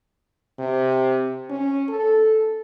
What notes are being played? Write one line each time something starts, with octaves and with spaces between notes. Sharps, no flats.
C3
C#4
A4